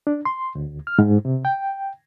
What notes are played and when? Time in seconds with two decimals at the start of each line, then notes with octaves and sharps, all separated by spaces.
0.07 D4
0.25 C6
0.55 D2
0.87 F6
0.99 G#2
1.25 C3
1.45 G5